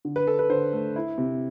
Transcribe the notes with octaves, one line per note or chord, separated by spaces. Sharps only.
D3
B4
D4 A4
B4
D3 C5
A3
E4
C3